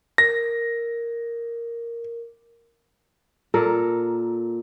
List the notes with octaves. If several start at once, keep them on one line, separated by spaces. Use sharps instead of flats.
A#4 A#6
A#2 A4 A#4